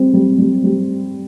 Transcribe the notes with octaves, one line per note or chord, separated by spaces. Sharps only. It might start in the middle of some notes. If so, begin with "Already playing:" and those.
Already playing: G3 C4
G3
G3
G3